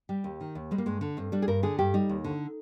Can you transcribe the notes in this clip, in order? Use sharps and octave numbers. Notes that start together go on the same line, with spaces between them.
G3 G4
D#2
D#3
D#2
G3 G#3
A#3
G2 G#3
D3
G2 C4
G3 D4
G#4
G2 A#4
D3 G#4
G2 G4
G3 D#4
D#2
D3